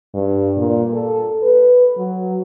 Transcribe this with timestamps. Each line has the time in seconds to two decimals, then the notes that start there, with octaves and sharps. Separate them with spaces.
0.14 G2
0.57 A#2
0.93 A4
1.43 B4
1.98 F#3